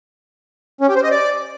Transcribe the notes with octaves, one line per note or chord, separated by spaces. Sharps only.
C#4
G4
C5
D#5
D5